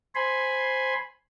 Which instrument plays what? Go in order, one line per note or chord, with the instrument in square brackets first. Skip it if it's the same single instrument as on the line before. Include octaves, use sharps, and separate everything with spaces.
[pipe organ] C5 G#5 B5 C6